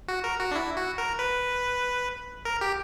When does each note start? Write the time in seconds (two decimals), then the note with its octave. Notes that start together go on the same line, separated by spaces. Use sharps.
0.08 F#4
0.24 A#4
0.40 F#4
0.51 D4
0.55 E4
0.77 F#4
0.98 A#4
1.19 B4
2.45 A#4
2.61 G4